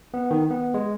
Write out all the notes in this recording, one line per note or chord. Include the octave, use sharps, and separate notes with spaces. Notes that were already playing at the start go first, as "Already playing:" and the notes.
B3
D#3
B3
G#3